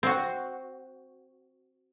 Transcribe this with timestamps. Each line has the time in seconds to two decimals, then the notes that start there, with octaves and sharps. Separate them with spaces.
0.03 C4 F#4